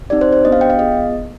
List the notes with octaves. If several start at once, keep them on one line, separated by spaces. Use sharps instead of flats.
C4 D#4 G4 D5
C5
C5
B3 D4 G4 D#5
F5
G5
F5
B3 F4 G#4 D#5